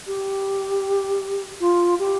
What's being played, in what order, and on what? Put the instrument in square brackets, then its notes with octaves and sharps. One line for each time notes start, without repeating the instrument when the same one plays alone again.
[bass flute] G4
F4
G4